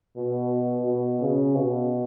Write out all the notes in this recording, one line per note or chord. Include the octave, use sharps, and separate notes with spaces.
B2
B2
C#3
B2